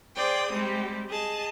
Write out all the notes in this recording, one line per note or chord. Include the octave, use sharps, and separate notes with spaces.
G#4 C5 D5 G5 D#6
G3 G#3 C4 G4
G#4 D#5 A5